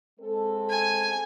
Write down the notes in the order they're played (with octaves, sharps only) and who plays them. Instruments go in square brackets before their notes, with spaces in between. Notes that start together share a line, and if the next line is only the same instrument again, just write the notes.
[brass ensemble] G#3 C4 A4
[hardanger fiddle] G#5